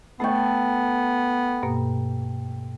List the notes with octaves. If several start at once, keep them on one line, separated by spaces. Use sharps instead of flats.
A3 B3 A4 G5 B5 C#6
G2 B2 A#3